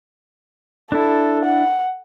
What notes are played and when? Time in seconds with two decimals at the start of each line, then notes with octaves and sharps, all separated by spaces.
0.92 D4 E4 A4
1.45 F#5